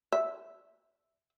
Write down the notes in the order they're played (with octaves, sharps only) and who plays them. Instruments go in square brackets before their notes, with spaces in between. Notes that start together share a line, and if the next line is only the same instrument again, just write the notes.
[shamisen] E5